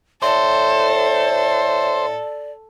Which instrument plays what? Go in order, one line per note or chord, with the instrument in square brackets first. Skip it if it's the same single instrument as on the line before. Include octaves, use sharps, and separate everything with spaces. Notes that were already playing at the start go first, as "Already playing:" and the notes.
[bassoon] A2 [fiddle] A4 [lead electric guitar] C5 [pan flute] D5